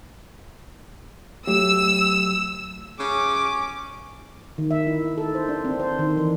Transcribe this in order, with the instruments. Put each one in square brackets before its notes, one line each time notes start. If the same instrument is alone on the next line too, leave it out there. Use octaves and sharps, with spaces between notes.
[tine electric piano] F#3 A3 G4 [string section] E6
[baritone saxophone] C#3 [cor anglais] C#4 [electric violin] D6
[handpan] D#3
E5
E4
A4
C5
D4
C4
C5
D#3
E3